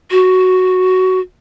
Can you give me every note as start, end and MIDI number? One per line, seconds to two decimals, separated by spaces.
0.11 1.20 66